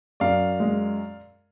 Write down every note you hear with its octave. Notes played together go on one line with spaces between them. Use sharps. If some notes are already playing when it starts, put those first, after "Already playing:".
F#2 D5 F5
G#3